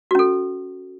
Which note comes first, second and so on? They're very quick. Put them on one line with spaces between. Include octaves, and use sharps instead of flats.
F#4 C#4 A4